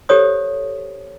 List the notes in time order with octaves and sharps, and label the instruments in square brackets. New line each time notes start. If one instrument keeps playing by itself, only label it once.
[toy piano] G4 A4 C5 C#5 D#6